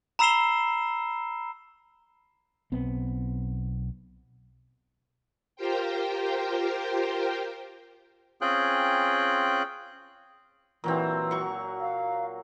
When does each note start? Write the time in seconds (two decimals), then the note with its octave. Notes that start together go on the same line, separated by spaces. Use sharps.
0.19 A#5 B5 E6 C7 E7 G7
2.72 B1 B3 C4
5.56 F4 G4 A#4 C5 G5
8.41 C4 C#4 F4 G#4 G5 F#6
10.84 A#2 E3 F#3 C4
11.31 F#3 C#6
11.81 F5